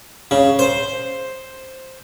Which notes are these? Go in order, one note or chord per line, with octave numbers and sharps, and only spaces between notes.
C#3
C5